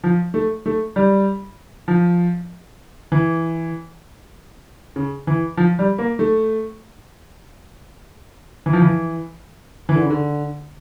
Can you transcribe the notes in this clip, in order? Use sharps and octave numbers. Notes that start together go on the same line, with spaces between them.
F3
A3
A3
G3
F3
E3
C#3
E3
F3
G3
A#3
A3
E3
F3
E3
E3
D3
C#3
D3